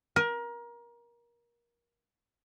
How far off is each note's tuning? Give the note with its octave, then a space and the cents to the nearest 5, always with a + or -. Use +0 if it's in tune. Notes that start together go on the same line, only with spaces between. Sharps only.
A#4 +25